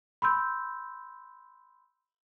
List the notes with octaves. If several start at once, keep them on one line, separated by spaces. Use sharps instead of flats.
B5 C6 E6 G6